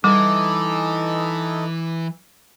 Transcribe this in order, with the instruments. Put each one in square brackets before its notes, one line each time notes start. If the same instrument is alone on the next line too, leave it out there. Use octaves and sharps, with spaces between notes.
[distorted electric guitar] E3 [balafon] G3 [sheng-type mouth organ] D#4 A4 D#5 [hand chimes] D6